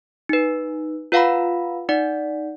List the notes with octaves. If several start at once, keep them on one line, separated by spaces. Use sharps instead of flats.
D#4 B4
F4 B4 F5 F#5 A#5 B5
D#4 D5 F#5